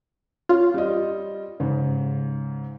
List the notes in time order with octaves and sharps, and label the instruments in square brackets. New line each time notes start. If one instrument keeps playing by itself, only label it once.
[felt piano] C#4 [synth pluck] F4
[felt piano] G3 D#5
G#2 C#3